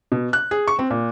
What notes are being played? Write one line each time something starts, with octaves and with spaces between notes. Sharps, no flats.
B2
F#6
G#4
C#6
C4
A#2